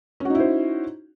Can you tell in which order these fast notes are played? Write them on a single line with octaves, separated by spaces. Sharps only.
C#4 F#4 D#4 E4 C5